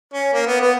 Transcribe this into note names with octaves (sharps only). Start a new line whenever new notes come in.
C#4
A#3
B3
B3